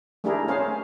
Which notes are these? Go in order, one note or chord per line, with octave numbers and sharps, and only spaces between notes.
A3 D4 E4 G4 G#4 A#4
A3 C#4 G#4 C5 F5